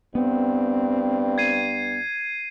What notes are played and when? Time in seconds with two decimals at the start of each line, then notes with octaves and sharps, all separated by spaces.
0.15 G2 B3 C4
1.38 G#6 C7 D#7